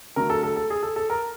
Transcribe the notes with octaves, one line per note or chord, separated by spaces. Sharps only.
D3 F#3 A3 A#4
A4
A4
A4
G#4
A4
A4
A#4